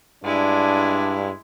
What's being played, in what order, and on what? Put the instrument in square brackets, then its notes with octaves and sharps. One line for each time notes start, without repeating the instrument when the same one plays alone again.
[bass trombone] G2 [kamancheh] G#3 E4 [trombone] D4